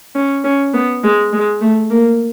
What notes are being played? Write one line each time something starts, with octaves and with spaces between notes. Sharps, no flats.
C#4
C#4
B3
G#3
G#3
A3
A#3